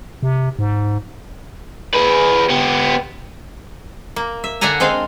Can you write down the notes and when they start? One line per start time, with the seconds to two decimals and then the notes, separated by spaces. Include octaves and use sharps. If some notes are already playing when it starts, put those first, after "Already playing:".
0.23 C3
0.59 G#2
1.94 G#4 B4
2.50 B3 G4
4.16 A#3
4.44 E5
4.61 D3 D4 E5 F#5 G#5 A#5
4.80 G#3 C4 G#4 F5